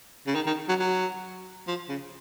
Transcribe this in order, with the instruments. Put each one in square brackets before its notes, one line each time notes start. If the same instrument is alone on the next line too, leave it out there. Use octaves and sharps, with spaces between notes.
[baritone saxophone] C#3
D#3
D#3
F#3
F#3
F3
C#3